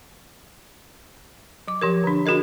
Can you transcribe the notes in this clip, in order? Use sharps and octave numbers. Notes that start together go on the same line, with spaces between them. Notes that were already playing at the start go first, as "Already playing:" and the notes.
F#3 D6
F3 G4 A#4
D3 D4
D4 F#4 G#4 A#4 D#5